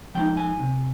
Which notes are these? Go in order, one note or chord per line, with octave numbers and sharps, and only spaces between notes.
F3 G#3 C4 D#4 G5
G#5
C3